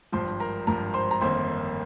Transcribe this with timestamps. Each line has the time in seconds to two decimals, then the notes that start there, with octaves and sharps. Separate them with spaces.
0.12 G#1 G2 F3 C5 C6
0.40 A#4 A#5
0.67 G#1 G2 F3 A#4 A#5
0.94 C5 C6
1.11 A#5
1.21 G1 F2 D#3 A#3 C5 C6